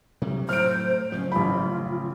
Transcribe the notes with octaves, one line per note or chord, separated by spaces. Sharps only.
C3 F#3 G3
A2 F#3 C5 F6 D7
F#1 F#2 F3 C#4
A1 F4 B5